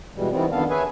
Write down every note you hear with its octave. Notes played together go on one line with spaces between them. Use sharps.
B2 E3 G3 G#3
D#3 E3 G3 B3 C4
F2 D3 D#3 B3 A4 F5
G#4 B4 C#5 E5 G#5